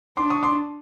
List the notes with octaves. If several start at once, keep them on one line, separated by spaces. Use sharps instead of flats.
D4 C6 D6
C#6 D#6
C6 D6